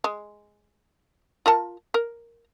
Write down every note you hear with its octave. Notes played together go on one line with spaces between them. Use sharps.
G#3
F4 A#4 A5
A#4